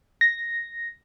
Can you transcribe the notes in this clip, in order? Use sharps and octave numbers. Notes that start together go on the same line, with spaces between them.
A#6